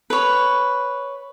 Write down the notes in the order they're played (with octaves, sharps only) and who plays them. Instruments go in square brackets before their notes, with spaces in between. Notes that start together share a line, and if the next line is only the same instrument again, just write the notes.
[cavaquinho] B4 C#5